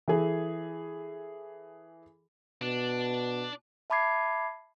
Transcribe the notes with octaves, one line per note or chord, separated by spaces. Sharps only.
E3 G#4 A4
B2 D4
E5 A5 B5 D6 G#6 C7